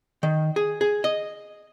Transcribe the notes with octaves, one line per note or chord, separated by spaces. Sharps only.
D#3
G#4
G#4
D#5